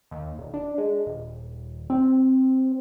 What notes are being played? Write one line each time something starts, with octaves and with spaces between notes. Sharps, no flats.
D#2
D#1
D4
G#3
D#1
C4